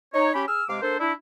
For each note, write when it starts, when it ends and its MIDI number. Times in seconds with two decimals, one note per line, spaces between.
0.14 0.33 63
0.14 0.33 73
0.34 0.43 61
0.34 0.43 67
0.34 0.43 83
0.48 0.63 68
0.48 0.63 80
0.48 0.63 88
0.48 0.63 89
0.69 0.77 48
0.69 0.77 56
0.69 0.77 77
0.69 0.77 86
0.82 0.98 58
0.82 0.98 62
0.82 0.98 69
0.82 0.98 72
1.00 1.12 62
1.00 1.12 64